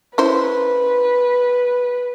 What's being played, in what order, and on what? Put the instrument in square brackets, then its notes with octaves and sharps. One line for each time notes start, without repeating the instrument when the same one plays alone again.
[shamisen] C#4 E4 C5 [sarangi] B4